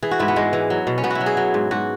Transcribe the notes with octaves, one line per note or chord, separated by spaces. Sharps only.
E3 G#4
F#4
G#2 E4
B3
G#2 G#3
E3
F#3
B2
C#4
B2 B3
E4 F#4
F#3
G#4
F#3
G#2
G#2 F#4